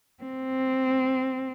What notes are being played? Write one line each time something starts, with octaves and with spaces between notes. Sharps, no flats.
C4